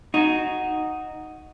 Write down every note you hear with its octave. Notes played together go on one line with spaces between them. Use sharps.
D#4 F#4